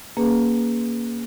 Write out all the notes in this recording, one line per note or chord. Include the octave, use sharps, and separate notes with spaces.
A#3 C#4 G#4 B4